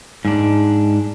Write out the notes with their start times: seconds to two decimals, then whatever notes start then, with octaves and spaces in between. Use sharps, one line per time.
0.25 G#2 D4